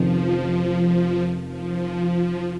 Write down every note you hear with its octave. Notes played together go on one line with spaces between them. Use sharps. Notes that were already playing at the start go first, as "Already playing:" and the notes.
Already playing: F1 F2 D#3 F3 C#4
F3